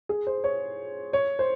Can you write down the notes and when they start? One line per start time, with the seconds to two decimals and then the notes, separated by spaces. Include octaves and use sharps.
0.09 G#4
0.27 C5
0.44 C#5
1.13 C#5
1.39 C5